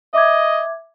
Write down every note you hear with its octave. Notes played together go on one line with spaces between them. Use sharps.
D#5 E5 D6 G#6